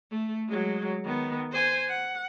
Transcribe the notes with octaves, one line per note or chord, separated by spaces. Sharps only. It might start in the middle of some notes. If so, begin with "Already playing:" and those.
A3
F#3 G#3
D#3 B3
C5 G#5
F#5